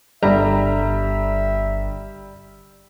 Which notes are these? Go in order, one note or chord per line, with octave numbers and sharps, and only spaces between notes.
G1 D3 G3 E5 A#5